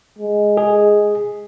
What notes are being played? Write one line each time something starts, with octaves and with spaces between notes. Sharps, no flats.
G#3
G#4